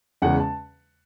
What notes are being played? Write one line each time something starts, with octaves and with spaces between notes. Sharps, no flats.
E2 C#3 G#3 F#5
A5